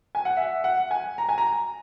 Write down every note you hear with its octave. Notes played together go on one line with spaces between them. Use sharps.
G#5
F#5
E5
F#5
G#5
A#5
G#5
A#5